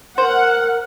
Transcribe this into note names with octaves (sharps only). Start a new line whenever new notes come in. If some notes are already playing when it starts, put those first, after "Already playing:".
A#4 C5 F#5